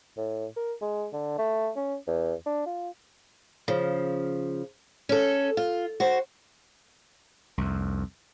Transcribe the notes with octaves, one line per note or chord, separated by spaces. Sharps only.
A2
A#4
G#3
D3
A3
C#4
E2
D4
F4
C#3 F3
C#4 A4
F4
F#4 C5
C2 F2